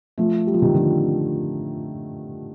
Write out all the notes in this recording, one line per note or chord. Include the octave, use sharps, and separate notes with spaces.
F3 A3
G3
F3
D#3 G3
D3 F3